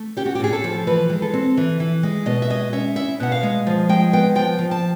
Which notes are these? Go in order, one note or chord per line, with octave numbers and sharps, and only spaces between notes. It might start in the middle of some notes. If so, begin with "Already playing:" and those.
Already playing: A3
C#4 G4
F#4
G4
A2 G#4
A4
F3
E3 B4
G#3
A4
C4
E3
E3
G#3
B2 D#5
E5
G#3 D#5
C#4 E5
E4 E5
B2 F#5
F5
G#3
F3
G#3 G5
B3 G5
F3 G5
F3
A5